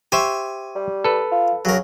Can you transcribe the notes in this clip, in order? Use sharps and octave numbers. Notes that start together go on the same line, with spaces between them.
G4 C5 E5 G#5 C#6
G3
A4 B4
F4
C#3 F#3 A#4